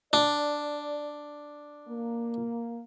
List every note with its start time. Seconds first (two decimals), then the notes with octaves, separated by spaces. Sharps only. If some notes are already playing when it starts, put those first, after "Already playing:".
0.13 D4 D5
1.88 A#3